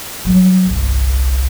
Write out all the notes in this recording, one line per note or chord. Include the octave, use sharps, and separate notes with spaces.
F#3 G3
G1 C2